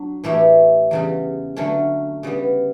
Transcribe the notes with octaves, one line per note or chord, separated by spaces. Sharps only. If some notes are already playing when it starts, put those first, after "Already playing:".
Already playing: F#3 D4
A2 E3 A3 E4 G4
E2 C#3 G3
D3 F#3 A3 C#4
C#3 G3 B3